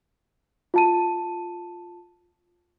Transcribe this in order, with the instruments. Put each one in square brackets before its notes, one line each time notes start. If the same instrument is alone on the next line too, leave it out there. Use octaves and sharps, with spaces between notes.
[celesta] F4 A5 D#7